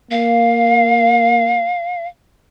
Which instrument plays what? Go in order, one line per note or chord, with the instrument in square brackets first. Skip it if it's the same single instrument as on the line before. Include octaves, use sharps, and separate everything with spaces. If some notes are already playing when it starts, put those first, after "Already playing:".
[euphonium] A#3 [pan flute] F5